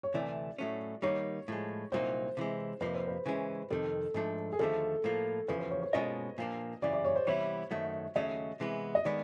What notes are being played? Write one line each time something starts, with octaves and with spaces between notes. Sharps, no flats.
C#5
D2 C3 E3 A3 D5
A2 F#3 A3 C#4
D#3 G3 A#3 D#4 C#5
A2 F3 G#3
C2 A#2 F#3 A#3 D#4 C5
C3 E3 G#3
F2 C3 F3 A#3 B4
C5
B4
C#3 E3 G#3 C#4
F2 C3 D#3 A4
G#2 F3 A3 D4
G#4
D#2 D3 F3 A3 A4
A2 F3 A#3
E2 C#3 F3 B4
C5
C#5
C#5
B2 G#3 C#4 F4 A#4 D#5
A#2 F3 A#3 D4
F#2 C#3 E3 D5
D5
C#5
C5
C3 E3 G3 B3 E4 C#5
F#2 D#3 F#3 A3
D#2 C#3 F#3 A3 C#4 D#5
C3 E3 G#3 B3
D#5
D#3 G#3 B3 D5